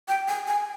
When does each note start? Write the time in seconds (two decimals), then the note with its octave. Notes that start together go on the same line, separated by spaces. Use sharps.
0.08 G5
0.28 G#5
0.47 G#5